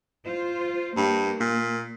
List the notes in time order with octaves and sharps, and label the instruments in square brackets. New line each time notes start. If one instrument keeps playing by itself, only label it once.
[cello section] F4 C5
[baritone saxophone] G2 [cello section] A#3
[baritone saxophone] A#2